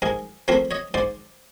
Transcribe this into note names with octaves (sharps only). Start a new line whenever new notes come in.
G#2 G#4 A#4
F3 A3 C4 A#4 C5
C#5 D#5
G#2 C5 D5